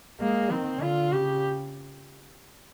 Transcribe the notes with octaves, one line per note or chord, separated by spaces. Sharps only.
G#3 A#3
D#3 C4
D3 F4
C#3 G4